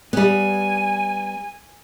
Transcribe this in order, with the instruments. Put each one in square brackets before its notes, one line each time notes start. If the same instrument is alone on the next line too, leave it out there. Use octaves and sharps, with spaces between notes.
[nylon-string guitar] G3 B3 [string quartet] G#5